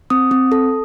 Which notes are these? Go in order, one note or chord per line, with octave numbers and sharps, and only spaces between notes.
C4 D#6
C4
A4